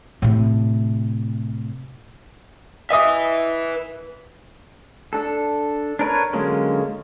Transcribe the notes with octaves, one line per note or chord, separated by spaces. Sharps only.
A2 C3
B4 D#5 E5 D#6
D4 A4
D4 A#4 B4 C#5
D3 F#3 G#3 A#3 C#4